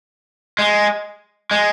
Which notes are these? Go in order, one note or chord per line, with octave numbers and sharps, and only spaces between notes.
G#3
G#3